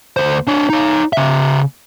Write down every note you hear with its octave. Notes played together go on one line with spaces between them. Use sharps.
D2 C5
D4 C#5
D#4 C#5
C#3 E5